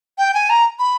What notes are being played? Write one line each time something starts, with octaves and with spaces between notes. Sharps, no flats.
G5
G#5
A#5
B5